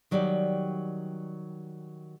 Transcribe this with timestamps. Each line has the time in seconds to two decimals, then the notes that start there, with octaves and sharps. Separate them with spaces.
0.11 D#3 F#3 G3 G4 D5